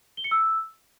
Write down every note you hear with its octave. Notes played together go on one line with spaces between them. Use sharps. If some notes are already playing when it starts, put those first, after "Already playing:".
G7
C#7
E6